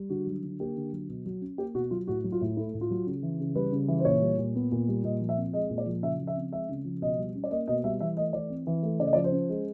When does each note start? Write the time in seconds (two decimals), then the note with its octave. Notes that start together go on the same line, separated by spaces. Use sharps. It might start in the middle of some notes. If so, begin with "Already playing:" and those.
Already playing: G3
0.09 D3 F#4
0.27 F#3
0.43 D3
0.60 A#3 G4
0.76 D3
0.93 F#3
1.09 B2
1.25 F#3
1.41 C#4
1.58 A#3 G4
1.74 B2 F#4
1.91 F#3 F4
2.07 A2 F#4
2.24 F#3
2.32 F4
2.41 A2
2.57 A3 E4
2.74 A2
2.81 F4
2.90 F#3
3.07 C#3
3.23 E3
3.40 C#3
3.55 G3 B4
3.72 C#3
3.88 E3
3.99 C5
4.05 A#2 C#5
4.21 G3
4.38 A#2
4.55 B3
4.72 A#2
4.88 G3
5.04 A#2 D#5
5.21 F3
5.29 E5
5.37 C4
5.53 G#3 D#5
5.70 A#2
5.78 D5
5.86 F3
6.02 C#3 E5
6.19 F3
6.27 E5
6.36 C4
6.52 G#3 E5
6.69 C#3
6.85 F3
7.02 B2 D#5
7.18 G3
7.35 C#4
7.44 D5
7.51 A#3 D#5
7.68 B2 D#5
7.84 G3 E5
8.00 E3 E5
8.17 A3 D#5
8.33 E3 D5
8.50 C4
8.67 E3
8.83 A3
9.00 C#3 D5
9.06 D#5
9.13 F3 D5
9.24 C5
9.32 C#4
9.49 G#3